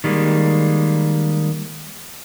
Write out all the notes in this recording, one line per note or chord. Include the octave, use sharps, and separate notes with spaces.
D#3 G3 G#3 A#3